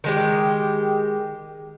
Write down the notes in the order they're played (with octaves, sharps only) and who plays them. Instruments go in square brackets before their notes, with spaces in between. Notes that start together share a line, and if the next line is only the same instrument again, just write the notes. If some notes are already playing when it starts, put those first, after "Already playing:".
[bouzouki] D#3 G#3 G4